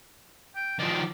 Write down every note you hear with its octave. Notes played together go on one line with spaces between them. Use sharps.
G5
D#3 F3 D5